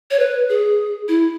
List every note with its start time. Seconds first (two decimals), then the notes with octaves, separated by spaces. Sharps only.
0.11 C#5
0.19 B4
0.49 G#4
1.08 E4